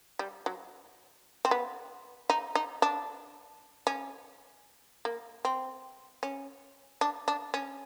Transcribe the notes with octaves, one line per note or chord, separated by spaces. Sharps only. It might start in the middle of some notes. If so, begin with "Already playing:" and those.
G3
F#3
C4
B3
D#4
D#4
D4
C#4
A#3
C4
C#4
D4
D4
C#4